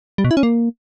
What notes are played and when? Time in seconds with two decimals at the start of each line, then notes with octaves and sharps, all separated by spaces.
0.18 G3
0.24 B2
0.31 E4
0.37 C#4
0.43 A#3